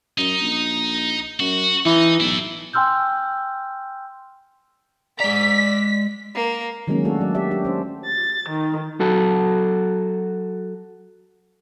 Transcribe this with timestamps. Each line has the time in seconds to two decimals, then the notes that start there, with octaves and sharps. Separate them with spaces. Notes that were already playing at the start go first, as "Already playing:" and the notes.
0.18 F#2 D#4
0.42 A#1
1.40 F#2 F#4
1.86 E3 D#4
2.20 B1 E4 A4
2.73 G5 G#5 C6 E6 F6 G6
5.20 G#3 D5 A#5 B6
6.35 A#3
6.87 D#3 F#3 G#3 A#3 C#4
7.05 A3 D4 F#4 A4
7.20 F#3 D5
7.35 G4 D5 E5
7.51 D4 G4
7.65 C#4 C5
8.06 A6
8.49 D#3
9.00 F#3 F#4 A4